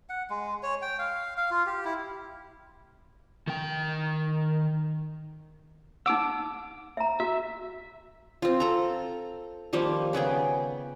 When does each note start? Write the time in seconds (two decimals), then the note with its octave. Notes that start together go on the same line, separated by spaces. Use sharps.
0.09 F#5
0.30 G#3
0.63 C#5
0.82 G5
0.99 F5
1.37 F5
1.51 F4
1.66 G4
1.85 E4
3.47 D#3 G5
6.06 D#4 F#5 D6 E6
6.97 E5 A#5
7.20 F#4 E5
8.42 C4 F4
8.60 A4 A#5
9.73 D#3 F3 G3 A#3
10.13 C#3 B3 G#4 G5